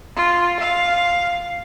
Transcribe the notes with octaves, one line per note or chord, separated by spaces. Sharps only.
F4
F5